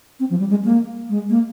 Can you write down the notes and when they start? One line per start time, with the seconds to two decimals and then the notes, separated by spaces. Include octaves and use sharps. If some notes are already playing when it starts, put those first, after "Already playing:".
0.20 C4
0.30 F3
0.39 G3
0.50 G#3
0.65 A#3
1.09 G#3
1.30 A#3